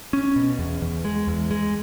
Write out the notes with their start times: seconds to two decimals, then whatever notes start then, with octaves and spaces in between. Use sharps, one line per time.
0.13 C#4
0.36 B2
0.59 E2
0.82 E2
1.05 G#3
1.27 E2
1.51 G#3